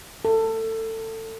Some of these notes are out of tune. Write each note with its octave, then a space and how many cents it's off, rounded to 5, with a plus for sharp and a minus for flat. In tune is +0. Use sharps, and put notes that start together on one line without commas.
A4 +25